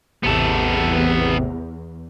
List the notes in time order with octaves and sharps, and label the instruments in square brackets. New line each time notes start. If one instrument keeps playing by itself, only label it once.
[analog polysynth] A1 C3 [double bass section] E2 [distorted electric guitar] B3 A4